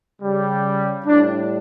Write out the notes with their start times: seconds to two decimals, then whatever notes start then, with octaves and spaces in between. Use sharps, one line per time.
0.21 C#3 G3
1.07 A2 G3 D4